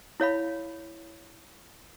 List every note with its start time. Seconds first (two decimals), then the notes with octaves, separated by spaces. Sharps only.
0.20 E4 C#5 F5 B5